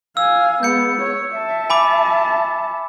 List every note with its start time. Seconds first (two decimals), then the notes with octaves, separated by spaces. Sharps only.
0.17 F5 G#5 E6
0.63 G#3 B3 G6 C#7
1.02 C#5
1.36 E5 A5
1.70 G#5 B5 D6